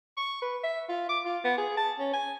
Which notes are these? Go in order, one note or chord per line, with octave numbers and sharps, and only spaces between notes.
C#6
B4
E5
F4
D6
F4
B3
G#4
A5
C#4
G#5